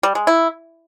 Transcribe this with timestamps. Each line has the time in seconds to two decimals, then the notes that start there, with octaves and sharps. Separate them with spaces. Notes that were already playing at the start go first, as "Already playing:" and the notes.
0.03 G3
0.15 G#3
0.27 E4